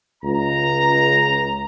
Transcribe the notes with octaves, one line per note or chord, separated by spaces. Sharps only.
C#2 A#5